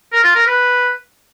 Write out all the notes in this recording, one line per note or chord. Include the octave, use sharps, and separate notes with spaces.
A#4
F4
A#4
B4